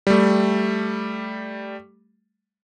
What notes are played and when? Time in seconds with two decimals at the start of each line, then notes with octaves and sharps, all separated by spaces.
0.07 G3 A3